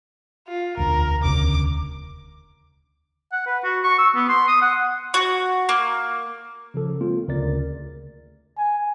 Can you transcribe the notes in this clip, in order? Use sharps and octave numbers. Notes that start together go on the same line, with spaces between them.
F4
E1 D2 A#4
E1 D2 C#3 D6
F#5
B4
F#4
C#6
E6
B3
C6
D#6
F#5
F#4
A#3
C#3 F3 A4
G#3 A#3 C4 F4
D2 C#3 A#4 D5 A6
G#5